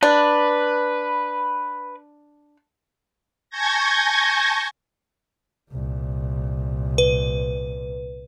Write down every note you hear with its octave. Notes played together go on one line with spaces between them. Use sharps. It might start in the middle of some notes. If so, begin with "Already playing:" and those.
D4 B4
G#5 A5 C#6 G6 G#6 A#6
C2 A#2
B4